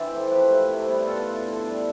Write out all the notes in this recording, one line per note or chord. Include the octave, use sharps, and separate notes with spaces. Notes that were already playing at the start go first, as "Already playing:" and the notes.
Already playing: E3 D4 C5 D5 E5 G5 A5
A3 C4
F3 G4 B4
A3 E4
C3
G3 B3 E4
B2 F4 A4
B3 E4
D3
G3 D4